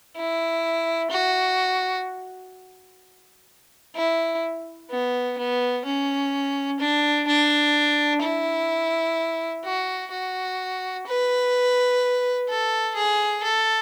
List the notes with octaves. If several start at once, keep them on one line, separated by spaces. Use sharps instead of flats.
E4
F#4
E4
B3
B3
C#4
D4
D4
E4
F#4
F#4
B4
A4
G#4
A4